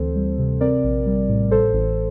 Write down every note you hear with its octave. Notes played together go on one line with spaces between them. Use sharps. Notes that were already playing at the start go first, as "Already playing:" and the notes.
Already playing: D2 E3 C4 A4 C5
G3
C3
C4 A#4 D5
A#1
G3
A2
A1 A4 C5
A1